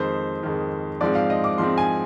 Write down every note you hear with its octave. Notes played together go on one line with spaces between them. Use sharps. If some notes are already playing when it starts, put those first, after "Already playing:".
Already playing: F2 D#3 G#3 C5
F2 D#3 G#3
G#2 F3 G#3 C4 D5
F5
D#5
D6
G#2 F3 G#3 C4 C6
G#5